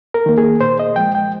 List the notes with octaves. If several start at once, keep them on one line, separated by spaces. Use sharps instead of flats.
A#4
D#3 A#3
G#4
A#2 C5
D#5
F3 G#3 G5
G5